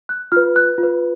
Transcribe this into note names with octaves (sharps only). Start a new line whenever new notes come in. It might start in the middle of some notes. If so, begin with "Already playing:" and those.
F#6
F4 B4 F6
F#6
F4
B4